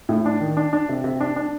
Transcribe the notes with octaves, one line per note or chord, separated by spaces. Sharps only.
A2
D4
D#3
D4
D4
C3
C3
D4
D4